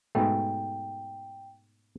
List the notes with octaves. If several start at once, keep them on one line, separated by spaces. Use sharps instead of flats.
G#2 B2 A3 G5